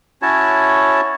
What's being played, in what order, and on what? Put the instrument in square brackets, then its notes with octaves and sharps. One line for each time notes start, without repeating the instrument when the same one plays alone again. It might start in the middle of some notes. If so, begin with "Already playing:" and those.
[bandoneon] C#4 E4 F#4 C#5 A5